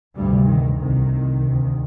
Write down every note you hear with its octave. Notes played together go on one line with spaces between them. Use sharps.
D2 G2 C3 G3
D#3
C2 C3 D#3
D2 C3